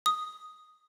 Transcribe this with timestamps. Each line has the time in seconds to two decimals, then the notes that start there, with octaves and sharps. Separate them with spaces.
0.06 D#6